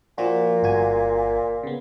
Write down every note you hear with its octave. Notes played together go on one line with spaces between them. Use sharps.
A#2 F3 A#3 F#4
G1 F#4 G#5
C#3 B3